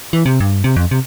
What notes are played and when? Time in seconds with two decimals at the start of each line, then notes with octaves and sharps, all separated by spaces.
0.13 E3
0.26 C3
0.40 G2
0.64 C3
0.76 F2
0.91 C3